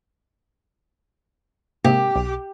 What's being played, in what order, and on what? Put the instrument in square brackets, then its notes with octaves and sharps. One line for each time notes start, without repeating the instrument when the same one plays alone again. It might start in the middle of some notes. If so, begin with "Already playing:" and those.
[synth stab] G#2 C3 A#3 [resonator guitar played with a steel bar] G4
[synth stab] B1